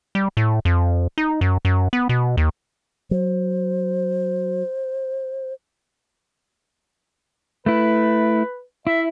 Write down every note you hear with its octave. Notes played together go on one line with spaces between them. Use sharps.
G3
A2
F2
D#4
F#2
F#2
B3
B2
D#2
F#3 C5
A3 E4 B4
E4 E5